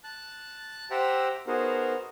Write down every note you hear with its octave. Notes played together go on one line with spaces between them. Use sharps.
A5 F#6
G4 C5 E5 F#5 G5 A#5
B3 D#4 F#4 G#4 A#4 C5